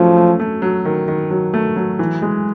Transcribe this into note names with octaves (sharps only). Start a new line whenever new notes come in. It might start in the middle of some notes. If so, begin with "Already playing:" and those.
Already playing: F3 F#3 A3 C#4
A3
A3
F#3
D#3
D#3
F#3
A3
F#3
E3
G#3